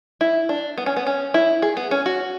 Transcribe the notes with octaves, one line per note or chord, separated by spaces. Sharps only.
E4
D4
B3
C#4
B3
C#4
E4
G#4
B3
C#4
F#4